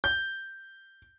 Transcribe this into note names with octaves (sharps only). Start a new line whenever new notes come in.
G6